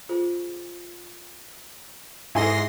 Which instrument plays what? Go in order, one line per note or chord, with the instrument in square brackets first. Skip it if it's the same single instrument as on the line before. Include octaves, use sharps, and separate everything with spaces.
[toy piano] F4 G#4 C5
[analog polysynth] G#2 C6 A#6 [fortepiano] E4 G#5 [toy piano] G4 A4